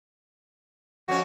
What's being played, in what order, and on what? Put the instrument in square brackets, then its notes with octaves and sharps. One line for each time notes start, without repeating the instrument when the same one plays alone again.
[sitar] F2 C#4 [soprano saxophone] F#4